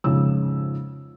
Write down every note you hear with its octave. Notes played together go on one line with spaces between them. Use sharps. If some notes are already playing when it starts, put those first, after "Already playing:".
F2 G#2 C#3 E6